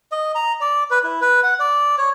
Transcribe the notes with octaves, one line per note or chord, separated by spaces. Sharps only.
D#5
A#5
D5
B4
E4
B4
F#5
D5
C#5